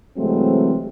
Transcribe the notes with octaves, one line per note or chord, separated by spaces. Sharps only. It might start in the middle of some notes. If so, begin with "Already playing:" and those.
C3 E3 F#3 G#3 A3 C4